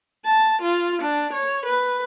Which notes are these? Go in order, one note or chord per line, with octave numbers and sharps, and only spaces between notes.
A5
F4
D4
C#5
B4